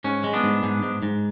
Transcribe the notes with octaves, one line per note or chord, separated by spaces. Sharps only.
G#2 C#4
G#3
B3 D4
G#2
G#2
G#2
G#2